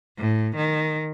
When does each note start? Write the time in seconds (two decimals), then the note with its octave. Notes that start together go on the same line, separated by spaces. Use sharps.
0.18 A2
0.56 D#3